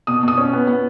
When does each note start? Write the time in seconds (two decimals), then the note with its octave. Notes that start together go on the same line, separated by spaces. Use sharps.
0.07 B2 D#6
0.23 B2 D#6
0.37 C#4
0.53 B3
0.67 B3